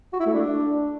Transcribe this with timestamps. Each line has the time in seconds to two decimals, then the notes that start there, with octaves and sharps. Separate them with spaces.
0.13 F#4
0.20 E4
0.26 A3
0.33 D4